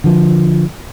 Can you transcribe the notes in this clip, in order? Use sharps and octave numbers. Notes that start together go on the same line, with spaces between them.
D3 F3